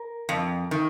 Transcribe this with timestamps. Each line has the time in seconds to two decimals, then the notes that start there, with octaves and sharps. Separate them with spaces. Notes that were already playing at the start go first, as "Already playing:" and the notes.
Already playing: A#4
0.29 F2
0.71 D#3